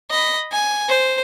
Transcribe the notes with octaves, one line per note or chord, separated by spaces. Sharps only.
D#5 B5
G#5
C5